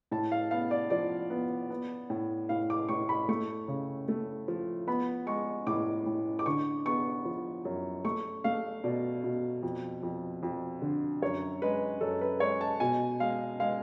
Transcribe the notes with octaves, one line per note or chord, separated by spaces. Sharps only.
A2 A5
F5
B3 F5
D5
F3 D5
B3
B3
A2
A2 F5
D6
A2 C#6
B5
A3 C#6
C#3
A3
F3
B3 B5
G#3 C#6
A2 D6
A2
D6
D3 C#6
B3 C#6
F3
F#2
A3 C#6
A3 F5
B2 D5
B2
F2
F2
F2
D3
F#2 C#5
G#3 B4
F#2 A4
B4
G#3 C#5
A5
B2 G#5
G#3 F5
G#3 F5